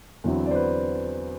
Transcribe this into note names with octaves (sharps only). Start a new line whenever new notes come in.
E2 D3 F#3 C4 E4
D5
C5
B4